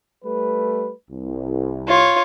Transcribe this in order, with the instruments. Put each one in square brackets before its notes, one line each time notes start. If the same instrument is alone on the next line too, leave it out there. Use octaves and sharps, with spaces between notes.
[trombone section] G3 A3 B4
C2
[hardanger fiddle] F4 C#5